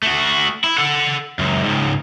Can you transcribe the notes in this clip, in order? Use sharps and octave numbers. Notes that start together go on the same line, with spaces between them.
A3 F#4
E4
A4 F#5
C#2 F#2
C#2 G#2